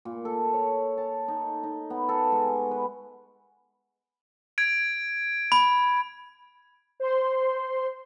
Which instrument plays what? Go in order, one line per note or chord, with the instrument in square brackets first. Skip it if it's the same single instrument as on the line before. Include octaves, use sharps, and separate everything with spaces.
[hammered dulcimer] A#2
A4
C#5
A5
D#4
D#4
B3
A4
G#3
C#6
B4
[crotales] G#6 D7
[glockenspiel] B5
[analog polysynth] C5 C6